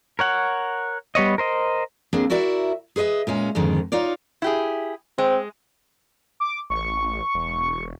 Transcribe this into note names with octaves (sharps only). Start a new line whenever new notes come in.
A#4 C#5 F#5
G3 B3 C#5 D#5
A#4 C5 D#5
A#3 C4 D4 G#4
E4 F#4 A#4 D5 E5
G#4 B4 C5 D#5 E5
A#2 G#3 C#4
F2 G#2 D3 D#3
D#4 F4 C#5 D5
E4 G4 G#4
G#3 C4
D6
A1 C#6
E1